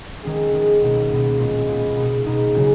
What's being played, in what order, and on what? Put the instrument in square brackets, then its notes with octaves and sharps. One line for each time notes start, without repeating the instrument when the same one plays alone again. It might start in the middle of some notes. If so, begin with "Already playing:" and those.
[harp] D#3 G#3 C#4 G#4
D#3 G#3 C#4 G#4
C#2 B2 A#3 D#4
C#2 B2 A#3 D#4
A#2 G#3 B3 F4
A#2 G#3 B3 F4
B2 A#3 D#4 G#4
B2 A#3 D#4 G#4
C#3 F#3 C#4 F#4